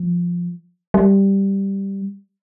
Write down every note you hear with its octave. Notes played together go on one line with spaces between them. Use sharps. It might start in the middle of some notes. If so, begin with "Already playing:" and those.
Already playing: F3
G3